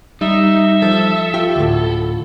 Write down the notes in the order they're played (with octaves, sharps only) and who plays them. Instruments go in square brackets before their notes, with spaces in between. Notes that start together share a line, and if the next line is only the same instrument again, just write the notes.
[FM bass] G3 [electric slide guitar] D#4 [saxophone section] E5
[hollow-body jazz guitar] F3 [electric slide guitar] A4
[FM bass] F4 [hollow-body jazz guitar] G4
[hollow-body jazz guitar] D2 A2